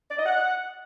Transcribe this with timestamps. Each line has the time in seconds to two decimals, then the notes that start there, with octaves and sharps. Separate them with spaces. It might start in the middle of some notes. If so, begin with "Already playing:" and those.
0.11 D5
0.18 D#5
0.26 F#5